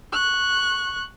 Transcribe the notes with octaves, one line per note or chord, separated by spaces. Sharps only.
C#6 F#6